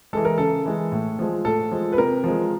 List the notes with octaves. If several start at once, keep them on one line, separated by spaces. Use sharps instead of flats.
E3 G#3 A4
A#4
C#3 A4
E3 G#3
A2
F3 G#3
A2 A4
F3 G#3
B4
C3 A#4
F3 G#3